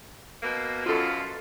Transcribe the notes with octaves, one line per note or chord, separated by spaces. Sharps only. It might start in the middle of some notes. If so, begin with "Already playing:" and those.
B2 A#3
F#2 B2 F3 F4 A4